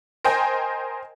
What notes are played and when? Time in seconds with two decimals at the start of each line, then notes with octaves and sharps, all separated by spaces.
0.24 A#4 C5 D#5 G5 G#5